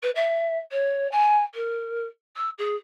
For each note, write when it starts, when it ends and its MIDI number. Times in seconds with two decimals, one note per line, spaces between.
0.02 0.10 71
0.15 0.59 76
0.72 1.10 73
1.11 1.43 80
1.54 2.06 70
2.36 2.49 88
2.58 2.75 68